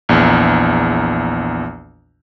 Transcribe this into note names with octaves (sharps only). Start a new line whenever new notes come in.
A#1 E2